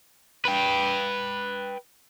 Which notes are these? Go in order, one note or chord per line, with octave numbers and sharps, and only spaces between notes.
B4 G5